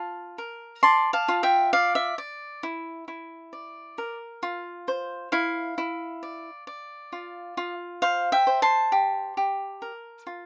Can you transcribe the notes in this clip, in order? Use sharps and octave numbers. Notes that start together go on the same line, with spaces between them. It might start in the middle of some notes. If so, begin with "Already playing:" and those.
Already playing: F4 A5
A#4
D5 A5 C6
F5 A5
F4
E5 G5
D5 F5
E5
D5
E4
E4
D5
A#4
F4
C5
E4 F5
E4
D5
D5
F4
F4
C5 F5
E5 G5
C5
A5 C6
G4
G4
A#4
F4